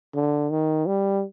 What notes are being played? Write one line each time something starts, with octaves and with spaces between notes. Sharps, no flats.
D3
D#3
G3